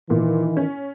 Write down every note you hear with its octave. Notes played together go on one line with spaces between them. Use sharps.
A#2 D#3 E3
C#4